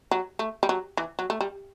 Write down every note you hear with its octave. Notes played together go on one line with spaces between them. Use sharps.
F#3
A3
G3
F#3
E3
F#3
A3
G3